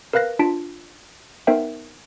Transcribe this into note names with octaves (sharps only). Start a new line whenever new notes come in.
A#4 B4 F5 F#6 A#6
D4 F4 A5 B6 D7
B3 D#4 A#4 C5 E5 G5